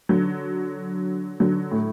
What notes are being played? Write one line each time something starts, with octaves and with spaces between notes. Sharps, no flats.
D3 F#3
D3 F#3
A2